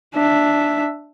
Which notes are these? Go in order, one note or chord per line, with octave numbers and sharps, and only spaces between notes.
D4 E5